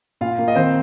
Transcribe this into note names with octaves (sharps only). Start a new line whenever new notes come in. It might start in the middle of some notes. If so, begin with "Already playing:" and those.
A#2 F4 F5
A#3
D#5
D#3 C4 C5